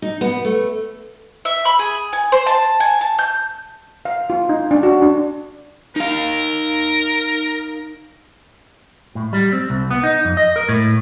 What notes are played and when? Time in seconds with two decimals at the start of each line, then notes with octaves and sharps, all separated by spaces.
0.02 D#4
0.21 B3
0.45 A3
1.45 E5
1.65 B5
1.79 G#4
2.13 G#5
2.32 C5
2.46 A5
2.80 G#5
3.01 A5
3.18 G6
4.05 F5
4.30 F4
4.49 D#4
4.71 D4
4.83 F#4
5.02 D4
5.96 D#4 A#4 F5
9.15 A2
9.33 G3
9.53 C4
9.70 C2
9.91 B3
10.04 D#4
10.25 F2
10.37 D#5
10.56 A#4
10.69 A2